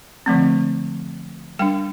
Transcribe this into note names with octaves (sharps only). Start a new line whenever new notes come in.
D3 F3 A3 C4
G3 D4 G5